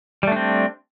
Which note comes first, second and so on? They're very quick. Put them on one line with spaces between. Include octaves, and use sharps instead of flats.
G3 A3 D4 C4